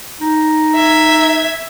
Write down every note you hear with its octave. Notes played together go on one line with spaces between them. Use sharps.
D#4
E5 G#6